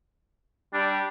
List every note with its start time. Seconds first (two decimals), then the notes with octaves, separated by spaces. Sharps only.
0.73 G3 D4